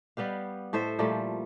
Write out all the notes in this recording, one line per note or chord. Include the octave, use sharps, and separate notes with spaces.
G3 B3 G4 F5
A2 A4 C5 E5
A#2 F3 G3 A3